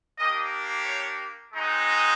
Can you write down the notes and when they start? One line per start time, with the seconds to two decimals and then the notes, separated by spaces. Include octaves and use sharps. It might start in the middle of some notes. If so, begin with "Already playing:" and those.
0.19 A#3 D4 G4 D#5
0.86 C#5
1.53 G#3 C4 D#4 F#4